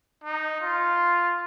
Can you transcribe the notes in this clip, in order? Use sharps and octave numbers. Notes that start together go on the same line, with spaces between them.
D#4
F4